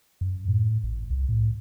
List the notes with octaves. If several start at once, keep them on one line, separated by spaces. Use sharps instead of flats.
F#2
A2
A1
C2
A2